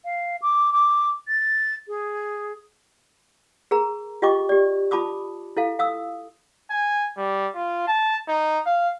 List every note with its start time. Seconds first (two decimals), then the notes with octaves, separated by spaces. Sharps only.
0.04 F5
0.41 D6
0.72 D6
1.27 A6
1.87 G#4
3.71 G#4 A#4 A#5
4.22 F4 G4 D#5 G5 C#6 D6
4.49 G4 D5
4.91 F4 A5 B5 D6 D#6
5.57 E4 A4 F5
5.79 F5 D#6 E6
6.70 G#5
7.17 G3
7.55 F4
7.88 A5
8.28 D#4
8.66 F5